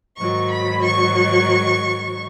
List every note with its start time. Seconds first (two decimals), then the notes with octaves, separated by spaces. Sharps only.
0.17 G#2 D#3 F#3 C#6
0.50 B5
0.83 C#6